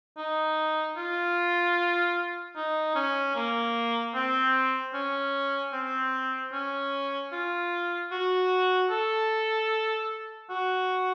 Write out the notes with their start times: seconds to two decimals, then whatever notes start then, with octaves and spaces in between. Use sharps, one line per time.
0.18 D#4
0.97 F4
2.56 D#4
2.95 C#4
3.36 A#3
4.14 C4
4.94 C#4
5.73 C4
6.53 C#4
7.32 F4
8.12 F#4
8.91 A4
10.50 F#4